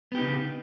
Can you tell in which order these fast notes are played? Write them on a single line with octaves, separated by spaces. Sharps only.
B3 G4 D#4 C#3